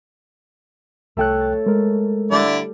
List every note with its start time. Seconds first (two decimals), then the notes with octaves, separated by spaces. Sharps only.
1.17 C2 A3 A4 C#5 G5 F#6
1.41 A6
1.66 G#3 A#4
2.31 D3 G3 E4 D5